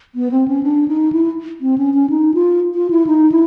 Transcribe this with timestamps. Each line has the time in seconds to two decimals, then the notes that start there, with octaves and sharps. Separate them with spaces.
0.15 B3
0.31 C4
0.48 C#4
0.63 D4
0.88 D#4
1.12 E4
1.61 C4
1.78 C#4
1.94 C#4
2.10 D#4
2.34 F4
2.75 F4
2.90 E4
3.07 D#4
3.32 E4